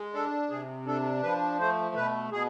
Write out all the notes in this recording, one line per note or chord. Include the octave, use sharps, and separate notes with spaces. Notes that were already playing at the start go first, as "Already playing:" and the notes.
Already playing: G#3
D4 A4
C3 G#4
D4 A4
F3 B4
A3 C5
B2 B4
B2 G#4